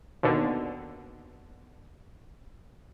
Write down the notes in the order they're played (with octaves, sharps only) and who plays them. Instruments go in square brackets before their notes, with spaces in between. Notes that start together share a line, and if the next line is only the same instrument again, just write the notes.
[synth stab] D#2 B2 D3